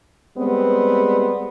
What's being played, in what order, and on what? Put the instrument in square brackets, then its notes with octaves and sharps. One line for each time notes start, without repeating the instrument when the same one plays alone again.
[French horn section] G3 G#3 B3 C4